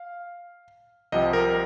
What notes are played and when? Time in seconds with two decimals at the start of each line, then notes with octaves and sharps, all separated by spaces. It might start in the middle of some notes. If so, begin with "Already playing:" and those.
Already playing: F5
1.12 C2 C3 F3 C4 D#5
1.33 A#4